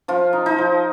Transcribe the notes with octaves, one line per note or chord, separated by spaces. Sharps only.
F3 F4
D#4
D#4
F3